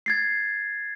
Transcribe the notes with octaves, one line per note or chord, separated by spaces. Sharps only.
G#6 A6 C7